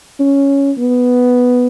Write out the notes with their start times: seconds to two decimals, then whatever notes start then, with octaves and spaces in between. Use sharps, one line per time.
0.20 C#4
0.78 B3